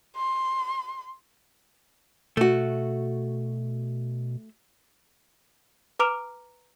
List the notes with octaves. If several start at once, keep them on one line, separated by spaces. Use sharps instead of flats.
C6
B2 A3 F#4
B4 A#5 D6 F6 D7 F7